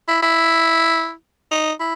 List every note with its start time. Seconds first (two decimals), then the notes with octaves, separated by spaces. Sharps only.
0.08 E4
0.22 E4
1.52 D#4
1.80 E4